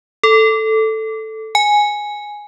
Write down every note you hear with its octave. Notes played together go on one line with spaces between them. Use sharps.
A4
G#5